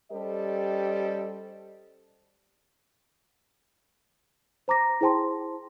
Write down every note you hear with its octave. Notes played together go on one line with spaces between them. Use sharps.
G3 C#4 G4 A4 C5 D#5
C5 A#5 D6 A#6
E4 G#4 C5 G5 A5 C6